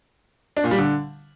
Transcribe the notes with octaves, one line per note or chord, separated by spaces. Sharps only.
D4
A#2
G3
D3